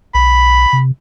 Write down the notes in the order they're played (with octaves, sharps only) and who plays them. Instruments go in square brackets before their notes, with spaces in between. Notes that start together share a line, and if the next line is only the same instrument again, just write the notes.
[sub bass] B1 [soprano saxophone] B5
[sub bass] C3